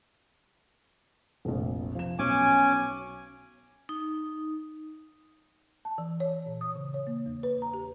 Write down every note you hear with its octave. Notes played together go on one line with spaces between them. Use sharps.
F1 A#1
F3 E7
B1 C#4 G#5 D6
D#4
A5
E3
C#5
A#2
D#6
C#3
C#5
A#3
E2
B4
A#5
G4